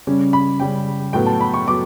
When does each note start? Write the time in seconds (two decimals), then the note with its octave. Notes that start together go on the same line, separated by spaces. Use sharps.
0.07 C#3 G3 C#4
0.33 B5
0.60 C#3 G3 C#4 G5
1.13 A2 F#3 B3 G5
1.26 A5
1.41 B5
1.54 C#6
1.66 F#3 B3 D6